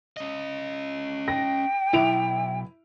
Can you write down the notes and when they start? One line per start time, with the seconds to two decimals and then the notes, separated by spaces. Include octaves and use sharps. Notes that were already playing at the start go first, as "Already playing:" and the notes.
0.17 C#4 D#5
1.28 G5 A#6
1.93 B1 E4 D7 F7